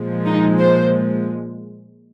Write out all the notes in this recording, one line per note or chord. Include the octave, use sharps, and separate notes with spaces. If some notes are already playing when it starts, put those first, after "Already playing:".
Already playing: A#2 F3 G#3
D#4
C5